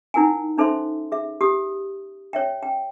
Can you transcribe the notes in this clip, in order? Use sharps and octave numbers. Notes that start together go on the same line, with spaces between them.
D#4 E4 A#4 F#5 G#5
C#4 D#4 A4 C5 E5 C6
G#4 E5
G4 D#6
C#5 E5 G5
G5